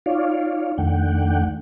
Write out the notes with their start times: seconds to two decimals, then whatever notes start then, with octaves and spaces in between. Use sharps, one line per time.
0.06 D#4 F4 C#5 D5 F5
0.78 F2 D#3 A3 D4 F#5 G5